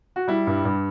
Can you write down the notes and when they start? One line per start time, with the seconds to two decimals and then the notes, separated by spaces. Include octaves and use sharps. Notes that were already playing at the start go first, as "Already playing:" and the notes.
0.16 F#4
0.28 G3 E4
0.47 G2
0.65 G2